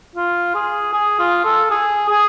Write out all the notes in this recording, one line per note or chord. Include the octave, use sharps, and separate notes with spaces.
F4
G#4
G#4
F4
A4
G#4
G#4